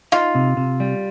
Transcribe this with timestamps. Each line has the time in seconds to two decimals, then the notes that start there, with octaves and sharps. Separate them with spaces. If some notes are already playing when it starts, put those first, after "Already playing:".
0.12 D#4 F4
0.35 C3
0.57 C3
0.80 G3